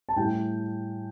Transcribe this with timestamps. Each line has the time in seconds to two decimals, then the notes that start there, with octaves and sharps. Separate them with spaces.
0.09 A5
0.16 A2 G3 C#4 G5